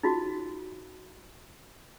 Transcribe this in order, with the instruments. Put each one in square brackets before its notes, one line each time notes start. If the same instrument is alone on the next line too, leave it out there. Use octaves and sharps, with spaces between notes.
[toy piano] D#4 F4 F#4